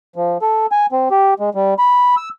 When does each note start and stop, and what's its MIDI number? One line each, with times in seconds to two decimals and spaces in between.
0.16 0.38 53
0.42 0.66 69
0.72 0.86 80
0.92 1.09 60
1.11 1.34 67
1.40 1.50 56
1.55 1.74 55
1.79 2.15 83
2.17 2.29 88